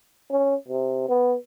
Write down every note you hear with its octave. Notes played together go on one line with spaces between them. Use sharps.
C#4
C3
B3